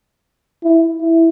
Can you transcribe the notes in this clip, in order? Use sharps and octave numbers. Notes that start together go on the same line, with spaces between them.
E4
E4